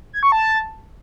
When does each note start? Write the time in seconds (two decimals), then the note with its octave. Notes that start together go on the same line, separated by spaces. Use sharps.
0.13 G#6
0.23 C#6
0.32 A5